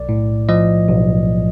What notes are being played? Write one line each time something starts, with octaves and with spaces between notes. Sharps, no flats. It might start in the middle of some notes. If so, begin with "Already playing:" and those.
Already playing: B1 D5
A2
F3 D#5
B1